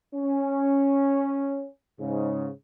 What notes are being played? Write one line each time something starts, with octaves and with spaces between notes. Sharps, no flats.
C#4
G#2 C#3